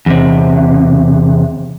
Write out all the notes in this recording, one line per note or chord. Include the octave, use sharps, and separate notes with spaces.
E2 C3